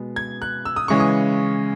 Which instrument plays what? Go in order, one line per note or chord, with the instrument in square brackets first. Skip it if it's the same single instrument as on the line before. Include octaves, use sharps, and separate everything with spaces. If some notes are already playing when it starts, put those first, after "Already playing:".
Already playing: [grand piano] B2 G#3 B3
G#6
F#6
E6
D#6
C#3 E3 G#3 C#4 C#6
D#6